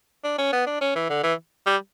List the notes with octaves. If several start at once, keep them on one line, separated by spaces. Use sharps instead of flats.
D4
C#4
B3
D4
C#4
E3
D3
E3
G3